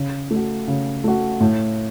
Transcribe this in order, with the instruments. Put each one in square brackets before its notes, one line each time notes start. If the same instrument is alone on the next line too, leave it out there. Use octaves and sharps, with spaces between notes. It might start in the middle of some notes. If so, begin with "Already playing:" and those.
Already playing: [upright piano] C#3
A3 F#4
C#3
A3 F#4
A2